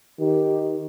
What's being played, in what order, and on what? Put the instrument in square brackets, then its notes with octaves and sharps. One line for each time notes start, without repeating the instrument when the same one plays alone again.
[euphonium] D#3 [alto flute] G4